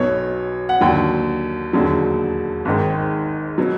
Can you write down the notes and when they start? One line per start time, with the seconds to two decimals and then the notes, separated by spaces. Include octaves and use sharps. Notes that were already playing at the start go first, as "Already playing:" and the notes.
Already playing: B1 B2 F#3 C#5
0.69 F#5
0.81 D#2 D3 F#3 G5
1.73 E1 D#2 D3 F#3
2.65 G#1 G#2 D#3
3.58 B2 F#3